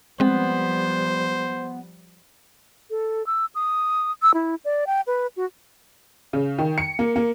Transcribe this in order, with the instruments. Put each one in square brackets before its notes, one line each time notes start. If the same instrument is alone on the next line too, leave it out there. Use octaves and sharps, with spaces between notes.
[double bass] F3 G3 [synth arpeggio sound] G#3 C4 [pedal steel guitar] B3 [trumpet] C5
[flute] A4
E6
D#6
E6
E4
D5
G5
B4
F#4
[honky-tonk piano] C#3
D#3
C#7
A#3
A#3